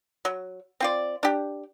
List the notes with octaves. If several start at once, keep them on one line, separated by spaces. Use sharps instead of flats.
F#3
C4 F4 D5
D4 G4